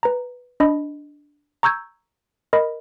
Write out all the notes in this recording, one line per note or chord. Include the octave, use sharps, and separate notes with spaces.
B4 A#5
D4 D#5 B5
A#5 C#6 E6 G6 G#6
A#4 D#5 B5